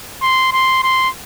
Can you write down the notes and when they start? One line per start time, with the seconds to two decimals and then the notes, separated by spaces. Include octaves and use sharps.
0.22 C6
0.52 C6
0.83 C6